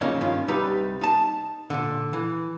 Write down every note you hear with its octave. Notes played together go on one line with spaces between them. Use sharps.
C#3 F3 F#3 A#3 C#4 D#4
G2 D#3 C#4 F4
C2 G3 D#4 B4 A#5
D#4 A5
A#2 D3
E3